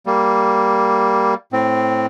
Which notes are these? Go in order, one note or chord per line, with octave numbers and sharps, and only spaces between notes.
G3 A#3
A2 C4